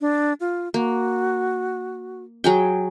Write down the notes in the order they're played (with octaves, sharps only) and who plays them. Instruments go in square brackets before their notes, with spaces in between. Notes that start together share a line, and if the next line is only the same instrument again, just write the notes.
[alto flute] D4
F4
[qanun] A#3 [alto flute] F#4
[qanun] F#3 G#4 G5